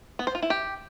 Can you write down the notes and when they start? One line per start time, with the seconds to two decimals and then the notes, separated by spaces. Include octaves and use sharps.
0.19 B3
0.27 C5
0.35 F4
0.42 E4
0.50 G4